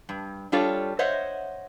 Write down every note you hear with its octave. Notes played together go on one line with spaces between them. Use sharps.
G2
G3 D4 F4 A4 C#5
C5 C#5 D#5 E5 F#5